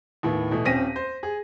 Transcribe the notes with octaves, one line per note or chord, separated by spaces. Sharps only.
D#2 A2 B3
B2 E3 A3
D#1 C4 C#4 A#6 B6 D#7
C5
G#4